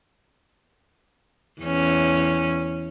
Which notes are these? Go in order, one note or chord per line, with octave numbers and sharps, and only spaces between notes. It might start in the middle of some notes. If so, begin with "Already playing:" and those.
E2 C#4